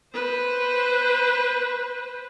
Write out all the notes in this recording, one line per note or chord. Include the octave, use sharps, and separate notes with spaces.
B4 C5